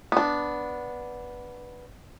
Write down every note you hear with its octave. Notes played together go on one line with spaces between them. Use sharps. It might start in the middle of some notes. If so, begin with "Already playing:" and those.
B3 D4